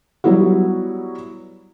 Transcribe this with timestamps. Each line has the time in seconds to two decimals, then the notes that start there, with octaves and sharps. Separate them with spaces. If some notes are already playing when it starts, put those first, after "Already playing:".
0.24 F#3 G3 B3 E4 F#4